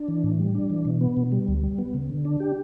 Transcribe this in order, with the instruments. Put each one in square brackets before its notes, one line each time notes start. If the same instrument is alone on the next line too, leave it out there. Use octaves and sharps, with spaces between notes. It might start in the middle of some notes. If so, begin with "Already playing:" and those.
Already playing: [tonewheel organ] D4
E3
A2
G3
D4
E3
B2
B3
B2
G3
D2
G3
B3
C#3
D3
D4
G4